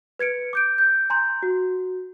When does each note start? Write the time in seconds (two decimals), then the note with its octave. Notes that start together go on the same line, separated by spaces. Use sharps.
0.19 B4 G#6 C#7 D7
0.53 D6 G6 D7
0.78 G6
1.10 G#5 A#5 C6 G6
1.43 F#4